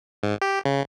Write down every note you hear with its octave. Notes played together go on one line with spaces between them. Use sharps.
G#2
G4
C#3